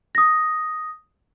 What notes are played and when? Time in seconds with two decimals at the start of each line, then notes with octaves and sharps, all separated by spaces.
0.15 D#6 A#6